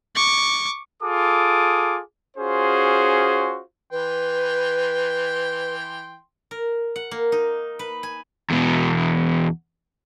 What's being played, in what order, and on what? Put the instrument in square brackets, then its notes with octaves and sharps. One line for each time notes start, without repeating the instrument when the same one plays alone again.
[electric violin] C#6 D6
[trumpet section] F4 G#4 A4 D6 D#6
C#4 F4 F#4 G#4 C5
[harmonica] E3 G5 C6 [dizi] B4
[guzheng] A#4
F#5
A#3
D#4
B4
G#5
[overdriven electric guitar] E2 B2